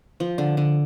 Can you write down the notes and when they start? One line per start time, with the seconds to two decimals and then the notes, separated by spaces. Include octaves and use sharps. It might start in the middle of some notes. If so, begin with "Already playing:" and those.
0.20 F3
0.38 D3
0.57 D3